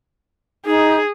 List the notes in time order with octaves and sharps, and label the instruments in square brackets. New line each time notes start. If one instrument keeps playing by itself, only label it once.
[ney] D#4 [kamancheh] G#4